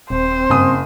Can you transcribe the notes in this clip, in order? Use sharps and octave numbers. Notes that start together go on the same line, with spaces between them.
D#1 C4 C5
F#1 G2 G#5 D#6